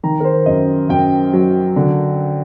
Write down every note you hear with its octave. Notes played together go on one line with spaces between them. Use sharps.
D#3 A#5
A#4
C5
F#2 D#5
F#2 G5
F#3
D3